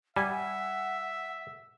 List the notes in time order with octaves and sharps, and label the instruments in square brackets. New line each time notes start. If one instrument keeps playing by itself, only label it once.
[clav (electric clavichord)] G3 [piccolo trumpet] E5 [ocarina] F#5 [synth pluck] G#5